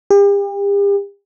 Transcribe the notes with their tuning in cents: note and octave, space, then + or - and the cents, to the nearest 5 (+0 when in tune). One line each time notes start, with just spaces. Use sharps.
G4 +40